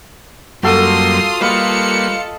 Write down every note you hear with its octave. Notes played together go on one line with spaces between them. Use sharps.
F#2 G3 A#3 F4 F#4 A4 C6 D#6
G3 A#3 A4 B4 D#5 F5 B5 C#7